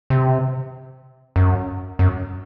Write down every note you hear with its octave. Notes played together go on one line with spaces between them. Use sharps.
C3
F#2
F#2